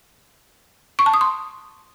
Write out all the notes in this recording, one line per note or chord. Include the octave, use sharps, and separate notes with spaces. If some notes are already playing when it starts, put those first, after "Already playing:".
C#6
A5
D#6
C6